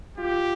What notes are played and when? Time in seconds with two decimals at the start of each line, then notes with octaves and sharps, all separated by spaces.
0.18 F4 G4